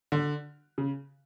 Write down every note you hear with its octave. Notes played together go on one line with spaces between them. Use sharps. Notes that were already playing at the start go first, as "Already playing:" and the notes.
D3
C#3